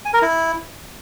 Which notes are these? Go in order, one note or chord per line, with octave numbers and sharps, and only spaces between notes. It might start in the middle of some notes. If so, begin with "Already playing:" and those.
G#5
A#4
E4